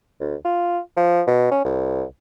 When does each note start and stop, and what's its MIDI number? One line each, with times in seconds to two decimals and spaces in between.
0.21 0.35 38
0.45 0.79 65
0.97 1.22 53
1.27 1.50 47
1.51 1.64 61
1.65 2.04 36